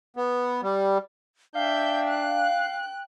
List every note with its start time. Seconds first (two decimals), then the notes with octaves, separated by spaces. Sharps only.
0.16 B3
0.63 G3
1.55 D4 E5 F5 G5 G6
2.08 F#6